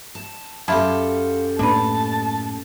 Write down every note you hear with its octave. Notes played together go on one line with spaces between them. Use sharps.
A5
F#2 E4 F4 G4 A4 A5
A2 A#3 D4 B4 A5